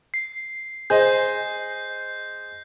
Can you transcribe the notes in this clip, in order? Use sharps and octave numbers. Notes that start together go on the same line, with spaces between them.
C7
G#4 C5 D#5 G6